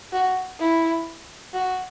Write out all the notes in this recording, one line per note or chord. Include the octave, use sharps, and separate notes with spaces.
F#4
E4
F#4